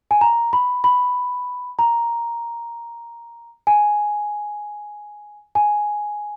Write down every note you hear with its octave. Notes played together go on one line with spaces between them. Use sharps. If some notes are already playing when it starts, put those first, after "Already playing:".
G#5
A#5
B5
B5
A#5
G#5
G#5